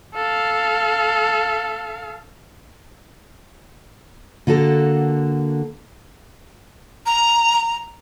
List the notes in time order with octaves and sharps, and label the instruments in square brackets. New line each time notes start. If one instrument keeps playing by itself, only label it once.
[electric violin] A4 F5
[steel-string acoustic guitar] D3 A#3 F#4 A4
[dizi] A#5